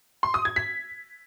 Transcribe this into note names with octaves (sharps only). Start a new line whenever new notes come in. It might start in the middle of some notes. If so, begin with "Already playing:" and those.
C6
D#6
G#6
B6